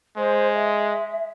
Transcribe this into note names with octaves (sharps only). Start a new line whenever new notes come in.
G#3 C5
E5